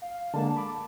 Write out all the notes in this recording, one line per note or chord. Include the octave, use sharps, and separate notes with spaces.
F5
D3 G#3 A#3 A5
B5 D6